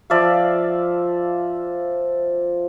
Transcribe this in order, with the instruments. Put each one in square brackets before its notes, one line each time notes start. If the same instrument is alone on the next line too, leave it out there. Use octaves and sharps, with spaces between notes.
[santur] F3 D5 E5 F5